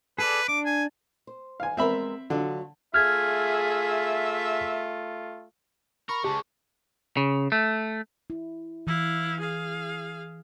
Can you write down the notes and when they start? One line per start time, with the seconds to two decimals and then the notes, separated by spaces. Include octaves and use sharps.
0.19 G#4 A4 B4 D5
0.48 D4 D6
0.66 G#5
1.27 C5
1.60 F5 G#5
1.77 G#3 B3 C4 A#4 E5 B5
2.30 D3 F#3 F4 F#4
2.94 A3 F4 G#4 E5 F6 G#6
6.09 A#4 B5 C#6
6.24 C#3 G#3 G4 A5
7.17 C#3
7.52 A3
8.30 E4
8.87 E3 E4 F5
9.40 G#4 F5